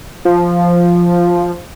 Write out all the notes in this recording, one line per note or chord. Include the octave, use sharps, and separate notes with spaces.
F3